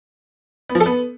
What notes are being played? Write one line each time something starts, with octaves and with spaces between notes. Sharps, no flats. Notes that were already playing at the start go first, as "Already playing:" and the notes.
B3
F3
A4
B3